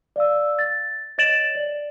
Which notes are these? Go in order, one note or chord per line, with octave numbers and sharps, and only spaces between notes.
D5 F5 E6
A6
C#5 D#5 A6 D7 E7 F#7
D5